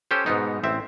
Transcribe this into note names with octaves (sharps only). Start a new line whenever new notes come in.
C#4 G4 A4 C5
G#2 B2 B3 D#4
A1 C4 E5